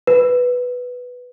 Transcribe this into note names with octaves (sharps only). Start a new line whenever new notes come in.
B4